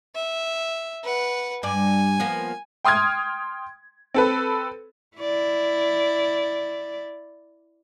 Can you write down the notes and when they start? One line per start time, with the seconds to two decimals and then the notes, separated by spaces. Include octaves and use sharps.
0.15 E5
1.04 B4 F#5
1.63 G2 D5 G#5
2.20 F3 A#3 B3
2.85 G5 C6 D#6 F6 G#6
4.14 C4 A4 B4
5.17 E4 D5